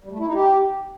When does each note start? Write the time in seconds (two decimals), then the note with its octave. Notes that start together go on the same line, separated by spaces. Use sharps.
0.04 G3
0.11 A3
0.19 E4
0.27 D#4
0.34 G4